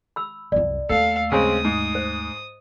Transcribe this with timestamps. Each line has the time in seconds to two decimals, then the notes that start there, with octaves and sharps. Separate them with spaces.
0.16 B5 E6
0.52 C2 F#2 D5
0.89 D#2 A3 A4 F5
1.32 C#3 G#3 C4 D#6
1.65 G#2
1.95 C5